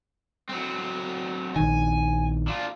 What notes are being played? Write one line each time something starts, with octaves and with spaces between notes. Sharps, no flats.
F#3 C4
A#1 D#3 G#5
D4 F4